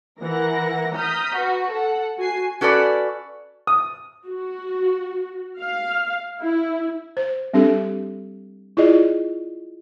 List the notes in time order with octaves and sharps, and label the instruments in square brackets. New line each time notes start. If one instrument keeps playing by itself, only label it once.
[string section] E3 A#4 F#5 A#6
A#5 D#6 F6 G6 B6
F#4 B4
A4 F#5
F#4 G#5 C7
[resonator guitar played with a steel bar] C#4 F#4 A4 B4 D5
[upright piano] D#6
[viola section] F#4
F5
E4
[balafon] C5
G3 C4 D4 G4 A4
E4 F4 G#4 D5 D#5